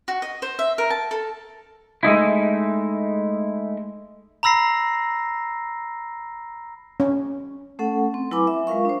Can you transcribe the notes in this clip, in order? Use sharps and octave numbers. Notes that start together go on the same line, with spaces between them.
F#4
D#5
C5
E5
A#4
A5
A4
G#3 A3 D#4 E4
A#5 B5 E6 A#6 C7
C#4
A3 C#4 A4 F#5
C4
F#3 E4 B4 G#5 B5 D6
E5
G#3 F4 A#4 F5 C#6
D4 C5